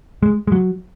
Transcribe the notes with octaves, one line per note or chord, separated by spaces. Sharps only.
G#3
G#3
F#3